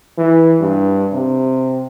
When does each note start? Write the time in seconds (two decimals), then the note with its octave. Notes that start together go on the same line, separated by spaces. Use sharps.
0.18 E3
0.61 G2
1.13 C3